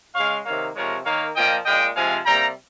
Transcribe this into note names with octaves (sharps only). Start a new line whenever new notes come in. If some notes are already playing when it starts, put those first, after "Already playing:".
C#3 G#3 C#5 F5
C3 D#3 A#3 C#5 F5
C3 F3 G#3 A#4 C#5
D#3 A#3 C#5 F5
A#2 F3 A#3 D#5 G5
A#2 G#3 D#5 G5
C3 F3 G#3 F5 G#5
C3 G3 A#3 G5 A#5